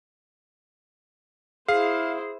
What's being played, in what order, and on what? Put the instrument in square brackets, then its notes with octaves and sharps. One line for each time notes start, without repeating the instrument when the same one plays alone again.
[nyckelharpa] E4 C5 [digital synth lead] G#4 [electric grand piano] F5